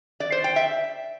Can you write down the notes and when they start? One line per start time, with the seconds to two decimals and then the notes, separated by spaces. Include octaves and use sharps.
0.20 D5
0.32 C5
0.44 G5
0.56 E5